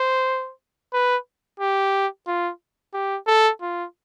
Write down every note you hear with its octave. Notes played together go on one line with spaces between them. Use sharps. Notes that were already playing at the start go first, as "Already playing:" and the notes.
Already playing: C5
B4
G4
F4
G4
A4
F4